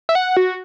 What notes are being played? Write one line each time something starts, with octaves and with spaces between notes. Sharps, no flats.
E5
F#5
F#4